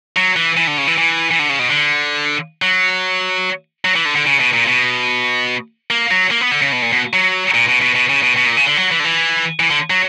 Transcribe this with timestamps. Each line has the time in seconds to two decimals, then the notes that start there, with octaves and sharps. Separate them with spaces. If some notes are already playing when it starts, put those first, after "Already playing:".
0.16 F#3
0.36 E3
0.57 E3
0.67 D3
0.78 C#3
0.87 E3
0.98 E3
1.31 E3
1.39 D3
1.49 C#3
1.59 B2
1.70 D3
2.62 F#3
3.85 F#3
3.95 E3
4.05 D3
4.15 D3
4.26 C#3
4.40 B2
4.53 A#2
4.68 B2
5.90 A#3
6.11 F#3
6.31 A#3
6.41 B3
6.51 D3
6.62 C#3
6.72 B2
6.82 A#2
6.93 B2
7.13 F#3
7.54 A#2
7.68 B2
7.82 B2
7.95 B2
8.09 C#3
8.23 B2
8.36 B2
8.47 A#2
8.57 C#3
8.67 D3
8.77 F#3
8.91 E3
9.00 D3
9.05 E3
9.60 E3
9.70 D3
9.90 F#3